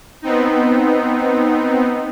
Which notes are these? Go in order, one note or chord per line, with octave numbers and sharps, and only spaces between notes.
B3 C4 D#4